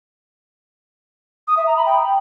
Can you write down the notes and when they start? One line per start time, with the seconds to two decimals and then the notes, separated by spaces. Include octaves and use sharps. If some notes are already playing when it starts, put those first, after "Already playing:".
1.47 D#6
1.57 E5
1.67 A#5
1.76 B5
1.86 G5